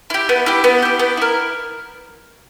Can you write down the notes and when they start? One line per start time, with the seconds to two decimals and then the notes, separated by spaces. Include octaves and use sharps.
0.10 E4 G4
0.29 B3
0.46 E4 G4
0.64 B3
0.82 E4 G4
0.99 B3
1.17 E4 A#4